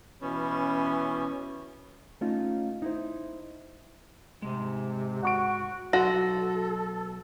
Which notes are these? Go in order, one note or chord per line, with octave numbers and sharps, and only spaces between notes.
B2 E3 C#4
A3 C#4 D#4 F4
D#4 E4 C5
G#2 C3 G#3
F#4 F#5 C#6 D7
B1 F#3 F#4 A4 C6 A#6